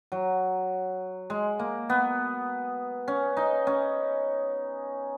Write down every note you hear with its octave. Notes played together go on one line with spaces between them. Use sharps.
F#3
G#3
A#3
B3
C#4
D#4
C#4